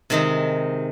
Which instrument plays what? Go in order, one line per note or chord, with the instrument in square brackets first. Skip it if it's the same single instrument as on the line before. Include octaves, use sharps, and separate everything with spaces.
[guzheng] C3 D#3 G#3 D#4